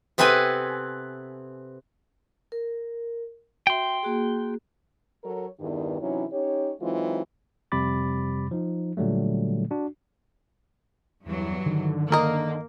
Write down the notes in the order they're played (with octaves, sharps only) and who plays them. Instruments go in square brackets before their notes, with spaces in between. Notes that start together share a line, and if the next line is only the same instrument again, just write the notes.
[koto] C3 B3 C4 A4 B4 G#5
[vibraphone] A#4
[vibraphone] F#4 E5 [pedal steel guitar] G5 C6
[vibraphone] A#3 F#4 G#4
[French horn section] F#3 A4 A#4 C#5
E2 G2 D#3
C3 E3 F#3 C#4 D#4 E4
C#4 D#4 G4 C#5
E3 F#3 G#3 C4 D#4 F4
[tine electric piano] F2 C3 G3 B5 D6 A6
F3 D#4
A#2 D3 F#3 G3 A3
D4 F#4
[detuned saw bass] E2 [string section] G2 E3 F#3
[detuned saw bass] D3 [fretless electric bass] D#3
[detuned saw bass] D3 [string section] A#3 [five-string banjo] A#4 D#5